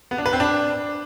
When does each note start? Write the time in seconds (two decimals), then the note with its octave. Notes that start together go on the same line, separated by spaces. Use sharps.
0.11 B3
0.18 D4
0.26 B4
0.33 C4
0.40 D4